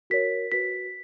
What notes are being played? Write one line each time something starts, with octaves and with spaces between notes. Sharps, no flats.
F#4 A#4 C#5 B6
F#4 B4 B6